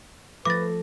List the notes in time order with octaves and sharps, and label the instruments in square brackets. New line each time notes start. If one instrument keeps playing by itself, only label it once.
[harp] F3 A#6 [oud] A3 [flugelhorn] B4 [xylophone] D6 A6